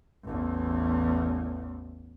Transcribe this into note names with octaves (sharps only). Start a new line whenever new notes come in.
A1 E2